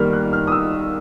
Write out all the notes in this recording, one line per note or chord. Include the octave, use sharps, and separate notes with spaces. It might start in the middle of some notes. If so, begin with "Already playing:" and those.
Already playing: D#3 G3 A#3 F6
F#6
F6
D#6
E6